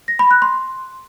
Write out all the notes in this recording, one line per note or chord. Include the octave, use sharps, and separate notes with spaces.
A#6
B5
F#6
C6